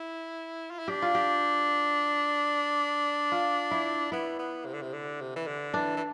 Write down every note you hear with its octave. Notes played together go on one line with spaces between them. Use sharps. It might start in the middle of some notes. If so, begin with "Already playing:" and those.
Already playing: E4
F4
E4
D4 G4
F4
G4
F4
E4
B3 E4
B3
C3
D3
C3
D3
C3
E3
D3
E3 D4
E3